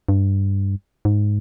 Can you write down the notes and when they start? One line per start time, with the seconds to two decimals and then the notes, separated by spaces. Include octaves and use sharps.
0.09 G2
1.05 G#2